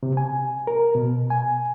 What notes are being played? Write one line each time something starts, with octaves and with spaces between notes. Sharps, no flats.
C3
G#5
A#4
B2
G#5